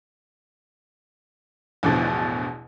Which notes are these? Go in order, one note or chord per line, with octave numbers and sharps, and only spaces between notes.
A1 E2 B2 D3 F3